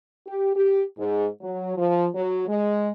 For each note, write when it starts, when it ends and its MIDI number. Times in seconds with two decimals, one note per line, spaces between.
0.27 0.51 67
0.55 0.82 67
0.97 1.26 44
1.41 1.73 54
1.77 2.07 53
2.15 2.45 54
2.47 2.90 56